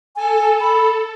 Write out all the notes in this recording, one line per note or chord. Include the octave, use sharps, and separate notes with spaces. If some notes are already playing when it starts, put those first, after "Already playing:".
A4 G#5
B5